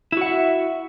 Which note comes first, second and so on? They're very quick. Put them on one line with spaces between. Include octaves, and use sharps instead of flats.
E4 F#4 F#5 E5